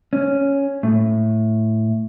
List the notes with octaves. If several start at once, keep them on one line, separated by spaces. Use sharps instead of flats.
C#4
A2